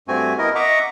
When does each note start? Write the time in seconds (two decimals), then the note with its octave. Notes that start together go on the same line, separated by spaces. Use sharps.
0.08 G2 A3 C4 F#4 G#5
0.38 B3 E4 A#4 D#5
0.55 D#5 E5 F#5 A#5 C#6 D6